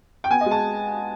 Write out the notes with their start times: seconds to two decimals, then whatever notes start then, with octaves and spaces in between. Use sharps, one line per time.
0.24 G5
0.30 B3 G#5
0.41 D#5
0.46 G#3
0.51 A5